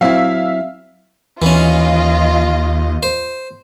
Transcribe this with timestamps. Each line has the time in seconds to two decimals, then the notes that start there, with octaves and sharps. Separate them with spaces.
0.01 F#3 C4 E4 E5 F5
1.42 D#2 E3 C#4 F4 D#5
3.03 C5